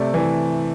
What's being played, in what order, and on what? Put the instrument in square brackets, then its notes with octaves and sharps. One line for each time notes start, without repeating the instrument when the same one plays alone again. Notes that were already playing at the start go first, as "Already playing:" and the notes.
Already playing: [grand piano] C3 A3 D5
E3